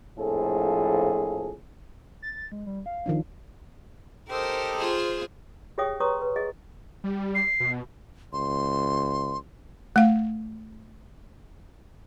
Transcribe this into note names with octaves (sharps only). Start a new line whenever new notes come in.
A#1 F2 A2 F3 G#4 A4
A6
G#3
G3
F5
D#3 F3 D4
D#4 G4 A4 A#4 C5
F4 G#4 C5
G4 G#4 C#5 E5 G5 D#6
B4 C#5 A#5 C6 C#6 D#6
B4
G#4 D#5
G3
C7
B2
C#2 C6
A3 F5